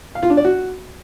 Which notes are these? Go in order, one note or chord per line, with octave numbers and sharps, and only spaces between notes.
F5
F4
D4
D5
F#4